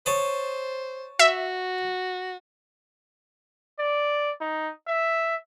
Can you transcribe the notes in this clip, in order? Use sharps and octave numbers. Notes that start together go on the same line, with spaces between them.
C5 C#5 A5 D#6
F#4 E5
D5
D#4
E5